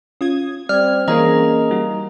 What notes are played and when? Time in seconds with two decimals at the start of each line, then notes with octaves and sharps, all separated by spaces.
0.21 C#4 F4 D#6 G#6
0.69 G3 C4 D5 F6 G#6
1.08 E3 A#3 C#4 G#4 A#4 D#5 A#5
1.71 G3 D#4 F#4